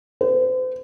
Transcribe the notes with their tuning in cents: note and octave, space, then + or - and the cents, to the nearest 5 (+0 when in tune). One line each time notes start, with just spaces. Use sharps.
C5 -40